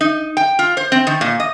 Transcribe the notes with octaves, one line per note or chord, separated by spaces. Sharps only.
D#4
G5
F4
C5
C4
D#3
A#2
D#5